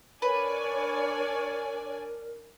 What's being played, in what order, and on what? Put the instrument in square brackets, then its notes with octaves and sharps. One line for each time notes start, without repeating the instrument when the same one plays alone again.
[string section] D4 D5 G#5 [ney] A#4 [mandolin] B4 [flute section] C#5